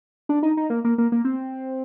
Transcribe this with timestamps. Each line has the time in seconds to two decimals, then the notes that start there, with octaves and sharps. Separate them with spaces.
0.29 D4
0.43 D#4
0.57 D#4
0.70 A#3
0.85 A#3
0.98 A#3
1.12 A#3
1.25 C4